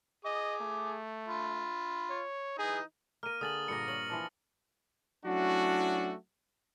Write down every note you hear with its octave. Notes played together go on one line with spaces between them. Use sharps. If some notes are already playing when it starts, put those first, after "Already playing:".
G#4 D#5 D6
A3
F4 B5
C#5
E3 D#4 G#4
A#3 A#4 F6 D#7
D3 G#4 D#6 A6 F#7
G2 A#2 A#3 A#6 C#7
C#5 F#7
E3 F3 D4
F#3 A3 C#4 D4 E4 F#4